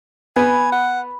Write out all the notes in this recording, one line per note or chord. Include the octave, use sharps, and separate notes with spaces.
B3 G#5 B5
F#5